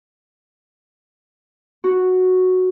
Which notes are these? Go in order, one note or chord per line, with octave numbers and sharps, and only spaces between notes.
F#4